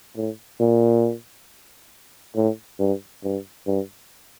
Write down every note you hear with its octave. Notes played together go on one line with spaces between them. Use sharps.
A2
A#2
A2
G2
G2
G2